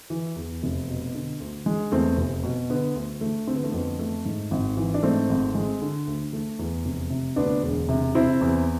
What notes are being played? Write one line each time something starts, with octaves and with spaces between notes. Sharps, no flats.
E3
E2
F1
B2
D3
D2
G#3
E2 A3 C4
F1
B2
D3 B3
D2
A3
D3 C4
B3
A3
F2 B3
A3
G#2
G#1
E3
D4
G#2 A3 C4
G#1
G#3
D3
D2
A3
E2
F1
C3
D2 B3 D4
E1
C3
C3 C4 E4
E2